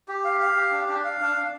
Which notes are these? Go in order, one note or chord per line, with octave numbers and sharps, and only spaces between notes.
G4
F5
F5
G4
D4
D4
F5
D4
D4